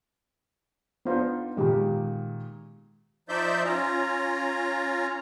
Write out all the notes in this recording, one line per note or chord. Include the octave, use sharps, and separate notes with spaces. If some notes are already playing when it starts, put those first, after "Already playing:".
B3 D4 D#4 F4 C5 F5
A#2 D#3 G#3 F4 G4
F3 D#4 C5 D5 E5 G6
C#4 F4 A#5